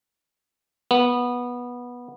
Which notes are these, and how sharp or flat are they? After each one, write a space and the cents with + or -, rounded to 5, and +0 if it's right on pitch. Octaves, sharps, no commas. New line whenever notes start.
B3 -15